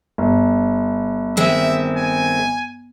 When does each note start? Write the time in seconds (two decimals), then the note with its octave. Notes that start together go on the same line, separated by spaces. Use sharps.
0.18 G1
1.37 D#3 G#3 C4 E5
1.97 G#5